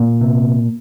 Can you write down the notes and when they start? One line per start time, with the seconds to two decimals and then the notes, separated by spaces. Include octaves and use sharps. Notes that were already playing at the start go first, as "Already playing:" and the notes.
Already playing: A#2 A#3
0.21 C3